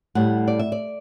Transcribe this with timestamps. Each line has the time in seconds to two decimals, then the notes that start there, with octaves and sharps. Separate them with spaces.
0.15 A2 G3 F#5
0.48 D5
0.59 E5
0.72 D5